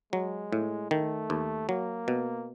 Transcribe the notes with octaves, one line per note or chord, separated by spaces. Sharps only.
F#3 G#3
A2
D#3 A3
D#2
F#3 A#3
B2